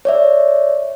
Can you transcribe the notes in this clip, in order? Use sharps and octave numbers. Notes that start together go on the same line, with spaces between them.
C#5 D5 E5